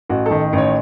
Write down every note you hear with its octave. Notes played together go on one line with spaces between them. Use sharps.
A1 F#4
D#3 A4
A1
C#5